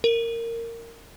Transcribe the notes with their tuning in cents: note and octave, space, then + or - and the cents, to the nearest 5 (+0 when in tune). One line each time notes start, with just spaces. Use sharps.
A#4 -15